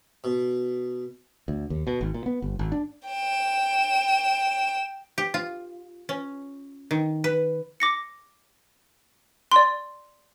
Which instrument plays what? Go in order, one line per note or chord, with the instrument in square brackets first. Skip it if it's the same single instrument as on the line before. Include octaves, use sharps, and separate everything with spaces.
[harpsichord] B2
[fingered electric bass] D2
D#2
B2
G#1
A#2
B3
G1
G#1
D4
[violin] G5 E7
[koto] G4
F4
C#4
D#3
B4
[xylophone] D6 A#6 C#7
D5 C6